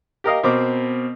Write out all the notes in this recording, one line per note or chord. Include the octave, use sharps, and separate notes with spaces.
G4 A#4 D#5 F5
B2 C4 A#4 D6